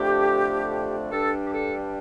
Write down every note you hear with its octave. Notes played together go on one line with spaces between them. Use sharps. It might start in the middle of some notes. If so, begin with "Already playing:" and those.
Already playing: F2 D3 A3 D4 G4
G2 G3 D4 A4
G4
A4